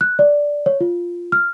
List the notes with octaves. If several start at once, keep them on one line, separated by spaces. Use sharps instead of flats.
F#6
D5
C#5
F4
F6